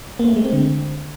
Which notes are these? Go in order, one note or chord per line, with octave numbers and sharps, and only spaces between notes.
A#3
A3
G#3
C4
D3